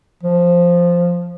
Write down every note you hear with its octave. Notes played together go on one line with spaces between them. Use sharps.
F3